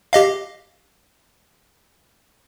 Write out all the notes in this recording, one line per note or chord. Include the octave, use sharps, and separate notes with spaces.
G4 D#5 F5